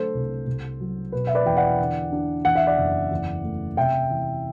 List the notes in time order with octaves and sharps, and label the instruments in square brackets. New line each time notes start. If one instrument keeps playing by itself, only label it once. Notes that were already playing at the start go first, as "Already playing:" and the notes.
Already playing: [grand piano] D3 F#3 A3 A4 C5
C2
C2
F#3
B2 B4
E5
B4 D5
E2 G5
D5 F#5
D3
D4
E2 F#5
E5
D5 F#5
F#1
E2
A3
C3 E5 G5
E3